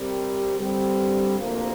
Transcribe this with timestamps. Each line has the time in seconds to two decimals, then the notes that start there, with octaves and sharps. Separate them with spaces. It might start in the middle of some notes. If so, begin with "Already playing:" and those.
Already playing: C3 G3 C4 G4 A#4
0.56 G2 D3 G3 C4
1.38 D2 C3 F3 A#3